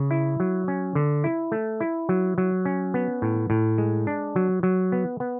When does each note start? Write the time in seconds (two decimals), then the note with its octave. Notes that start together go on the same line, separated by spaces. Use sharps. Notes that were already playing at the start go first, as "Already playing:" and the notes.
Already playing: C#3
0.11 E4
0.40 F#3
0.68 C#4
0.95 D3
1.24 E4
1.52 A3
1.80 E4
2.09 F#3
2.38 F#3
2.65 C#4
2.94 B3
3.22 A2
3.50 A2
3.78 G#3
4.07 D4
4.36 F#3
4.63 F#3
4.92 B3
5.20 B3